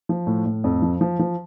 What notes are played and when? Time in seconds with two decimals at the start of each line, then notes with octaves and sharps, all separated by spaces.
0.09 F3
0.27 A2
0.46 A2
0.64 F2
0.82 F3
1.01 F3
1.19 F3